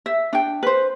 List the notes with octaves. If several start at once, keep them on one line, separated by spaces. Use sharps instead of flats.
E5
D4 G5
B4 C5